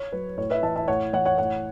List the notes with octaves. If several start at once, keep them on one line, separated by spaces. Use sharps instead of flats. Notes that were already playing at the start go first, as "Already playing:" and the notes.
Already playing: C#5
F#3 B4
A2 C#5
B4 E5
E3 E5 A5
E5 A5
A2 C#5 F#5
E3 C#5 F#5
C#5 F#5
A2 C#5 F#5